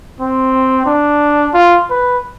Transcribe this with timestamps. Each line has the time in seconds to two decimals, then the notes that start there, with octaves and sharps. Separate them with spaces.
0.20 C4
0.86 D4
1.54 F4
1.90 B4